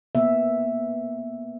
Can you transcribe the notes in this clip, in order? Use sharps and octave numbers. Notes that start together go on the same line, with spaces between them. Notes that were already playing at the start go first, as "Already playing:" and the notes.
A#3 B3 E5